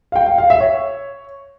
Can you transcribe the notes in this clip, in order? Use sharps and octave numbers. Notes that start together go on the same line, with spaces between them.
F5
G5
F5
F5
E5
C#5